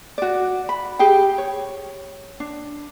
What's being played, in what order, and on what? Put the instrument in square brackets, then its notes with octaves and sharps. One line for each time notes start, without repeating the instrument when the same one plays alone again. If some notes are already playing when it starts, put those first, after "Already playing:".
[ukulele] F#4 D5
B5
G4 G#4 G5
C#5
D4